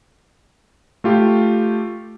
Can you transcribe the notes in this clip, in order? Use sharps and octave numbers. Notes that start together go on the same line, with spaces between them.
A3 F4 G4